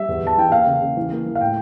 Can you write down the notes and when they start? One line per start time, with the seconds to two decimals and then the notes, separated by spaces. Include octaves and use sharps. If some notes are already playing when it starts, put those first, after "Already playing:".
Already playing: G3 E5
0.09 E2
0.23 E2 A5
0.37 E3 G5
0.52 A#3 F5
0.67 C#3
0.82 C#3
0.97 E3
1.12 A#3
1.26 E3
1.35 F5
1.41 A2 G5